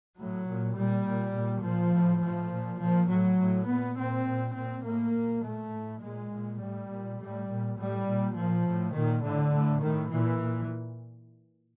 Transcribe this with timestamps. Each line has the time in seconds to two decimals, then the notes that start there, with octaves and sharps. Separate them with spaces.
0.17 A2 F#3
0.46 A#2
0.75 A#2 G3
1.05 A#2
1.34 A#2
1.63 A#2 F3
1.92 A2
2.21 A2 F3
2.51 A#2
2.80 A#2 F3
3.09 A2 F#3
3.38 A2
3.68 A#2 B3
3.97 A#2 C4
4.27 A#2
4.55 A#2 C4
4.84 A2 A#3
5.14 A#2
5.43 A#2 A3
5.72 A2
6.01 A#2 G#3
6.31 A#2
6.60 A2 G3
6.89 A#2
7.18 A2 G3
7.47 A#2
7.77 A2 G3
8.06 A#2
8.35 A#2 F3
8.65 A2
8.94 A#2 D#3
9.23 A2 D3
9.53 A2
9.81 A2 D#3
10.10 A#2 E3
10.40 A#2